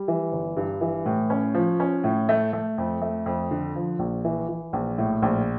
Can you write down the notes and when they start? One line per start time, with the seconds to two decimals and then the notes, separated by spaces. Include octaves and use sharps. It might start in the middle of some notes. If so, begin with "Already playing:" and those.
Already playing: G3
0.08 E3
0.32 G1
0.57 G2
0.81 E3
1.06 A2
1.30 C#4
1.54 F3
1.80 C#4
2.04 A2
2.29 A3
2.53 A3
2.78 F2
3.02 A3
3.26 F2
3.51 D3
3.76 F3
3.99 A#1
4.24 E3
4.49 E3
4.73 A#1
4.98 A2
5.22 A#1